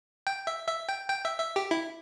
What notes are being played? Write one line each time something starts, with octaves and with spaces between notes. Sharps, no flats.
G5
E5
E5
G5
G5
E5
E5
G4
E4